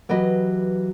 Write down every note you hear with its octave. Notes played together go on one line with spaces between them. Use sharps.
E3 F#3 G4 B4 D#5